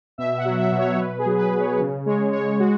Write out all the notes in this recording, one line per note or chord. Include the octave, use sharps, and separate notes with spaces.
B2 E5
F#5
F#3
E5
B2
C#5
B2 B4
G#4
F#3
B4
B2
C#5
C#3
G#3 C#5
G#3 C#5
G#3 F#4